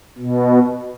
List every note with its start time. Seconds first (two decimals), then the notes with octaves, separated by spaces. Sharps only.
0.18 B2